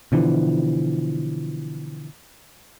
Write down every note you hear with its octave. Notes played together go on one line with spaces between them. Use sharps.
B2 D3 E3 F3